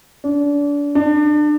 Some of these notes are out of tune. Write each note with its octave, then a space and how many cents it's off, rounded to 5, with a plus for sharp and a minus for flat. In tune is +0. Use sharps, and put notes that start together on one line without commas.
D4 -30
D4 +30